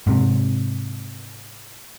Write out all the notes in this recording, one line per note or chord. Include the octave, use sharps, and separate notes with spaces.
G#2 C3